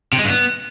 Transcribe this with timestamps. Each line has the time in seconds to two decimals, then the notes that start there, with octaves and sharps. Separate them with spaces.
0.13 C3
0.18 G#3
0.24 G2
0.30 B3